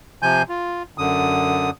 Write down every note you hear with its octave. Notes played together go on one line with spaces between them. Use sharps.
C3 F3 G#5 G6
F4
F#2 D3 D#6